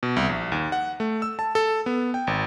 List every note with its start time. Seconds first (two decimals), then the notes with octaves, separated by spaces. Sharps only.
0.03 B2
0.17 C2
0.29 A#1
0.52 D#2
0.72 F#5
1.00 A3
1.22 E6
1.39 A5
1.55 A4
1.86 B3
2.14 G5
2.27 G#1